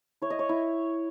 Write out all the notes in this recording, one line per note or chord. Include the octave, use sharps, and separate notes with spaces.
E4 C#5
D#5
C#5
E4